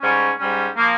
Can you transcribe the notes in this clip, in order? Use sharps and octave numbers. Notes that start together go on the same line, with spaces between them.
G#2 G3 C#4
G#2 G3 C#4
F3 A#3